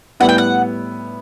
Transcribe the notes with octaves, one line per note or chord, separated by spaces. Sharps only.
A2 G3 B3 E4 F#5
G5
F#5